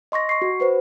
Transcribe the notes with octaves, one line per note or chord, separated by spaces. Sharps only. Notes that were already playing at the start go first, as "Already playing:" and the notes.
D#5 C6 C#6 A#6
C#6 C7
F#4
F#4 B4 C5